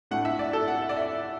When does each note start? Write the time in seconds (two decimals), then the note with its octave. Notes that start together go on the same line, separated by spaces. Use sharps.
0.11 A2 A3 D4 F#5
0.25 E5
0.39 D5
0.53 A4
0.68 F#5
0.82 E5
0.89 D5
0.97 E5